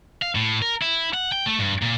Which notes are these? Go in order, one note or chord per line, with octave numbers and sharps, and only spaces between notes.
F5
A2
A#4
E4
F#5
G5
A3
G2
A#2